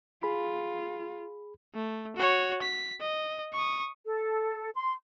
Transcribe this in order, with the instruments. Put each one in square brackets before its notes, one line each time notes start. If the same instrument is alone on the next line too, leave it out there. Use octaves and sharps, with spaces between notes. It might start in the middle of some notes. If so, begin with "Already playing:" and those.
[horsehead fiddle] F4 [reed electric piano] G#4 B5
[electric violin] A3
F#4 C#5
B6
D#5
C#6 D#6
[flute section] A4
C6